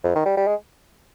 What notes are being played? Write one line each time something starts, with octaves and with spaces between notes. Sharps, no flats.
F2
D#3
G3
G3
G#3